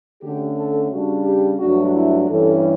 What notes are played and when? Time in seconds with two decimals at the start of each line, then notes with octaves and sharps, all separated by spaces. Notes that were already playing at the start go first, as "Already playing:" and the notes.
0.21 D3 A3 C#4 G4
0.56 A4
0.90 C#3 G3 D4 F#4
1.26 G4
1.59 G2 F#3 A3 D4 F#4
1.94 E4
2.28 G2 E3 G3 C#4 A4